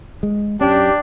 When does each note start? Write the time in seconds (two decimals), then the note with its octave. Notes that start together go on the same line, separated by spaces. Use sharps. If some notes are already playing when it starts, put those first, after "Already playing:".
0.23 G#3
0.61 F#2 C#4 D4 G4